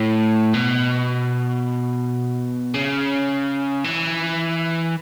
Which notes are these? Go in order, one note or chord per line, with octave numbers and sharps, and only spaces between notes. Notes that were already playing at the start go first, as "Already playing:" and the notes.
Already playing: A2
B2
C#3
E3